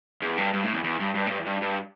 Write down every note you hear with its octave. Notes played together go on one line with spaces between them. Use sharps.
E2
G2
G2
A2
E2
E2
G2
G2
A2
G2
E2
G2
G2